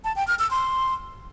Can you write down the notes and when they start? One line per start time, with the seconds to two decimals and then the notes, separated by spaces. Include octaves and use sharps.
0.04 A5
0.16 G5
0.28 F6
0.39 E6
0.51 C6